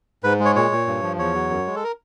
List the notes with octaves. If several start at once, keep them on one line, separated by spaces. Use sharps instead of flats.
G#2 B4
G#3
C#5
A#2 C#5
A#2
G2
F3
E2 C#5
F#3
F#2
G#3
A4
A#4